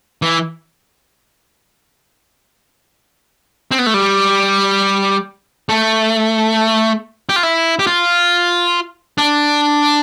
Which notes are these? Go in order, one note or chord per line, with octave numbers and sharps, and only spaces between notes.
E3
C4
B3
A3
G3
A3
G4
F4
E4
G4
F4
D4